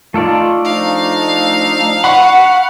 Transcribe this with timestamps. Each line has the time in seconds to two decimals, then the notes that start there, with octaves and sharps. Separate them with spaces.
0.14 A3 D#4 F4 A4 D5
0.65 F3 D4 D#4 F5
2.04 F#5 B5 C#6